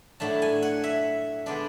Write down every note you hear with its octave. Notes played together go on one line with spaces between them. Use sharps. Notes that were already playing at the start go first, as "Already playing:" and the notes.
A2 F#3 A3 D4 A5
G#5
F#5
E5
D3 G#3 B3 D4 D5